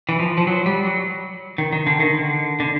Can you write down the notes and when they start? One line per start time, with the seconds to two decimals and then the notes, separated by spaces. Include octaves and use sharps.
0.09 E3
0.20 F3
0.38 F3
0.47 F#3
0.66 G3
0.85 F#3
1.58 D#3
1.73 D#3
1.87 D3
2.00 D#3
2.14 D3
2.60 D3